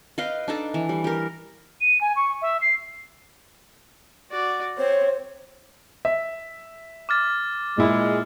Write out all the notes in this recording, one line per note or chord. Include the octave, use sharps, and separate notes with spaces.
B4 D#5 F5 G5
D4 D#4 A4 D6
E3
G3
G4 A#4
D#7
G#5
C#6
E5
C7
F#4 D5
C4 C5 C#5
E5
D6 F6 A6
A#2 G#3 E4